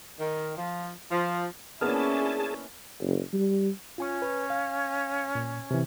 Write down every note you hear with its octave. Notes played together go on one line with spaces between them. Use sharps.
D#3
F3
F3
A#3 B3 C#4 D4 E4 G#4 A5 F6
F#1
G3
C#4 F4 G#5 C#6
B4
F5
A#2
C3 E3